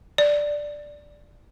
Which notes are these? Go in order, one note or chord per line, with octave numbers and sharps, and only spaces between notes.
D5